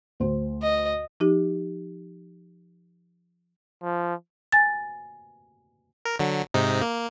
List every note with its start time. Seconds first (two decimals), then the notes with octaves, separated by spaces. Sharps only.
0.20 D2 C5
0.62 D#5
1.20 F3 D#4 G4
3.83 F3
4.52 G#5 A6
6.05 A#4
6.19 D3 F#3
6.54 G#2 C3 D#4
6.82 A#3